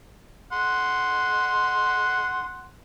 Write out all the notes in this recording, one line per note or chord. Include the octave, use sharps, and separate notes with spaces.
F#5 C6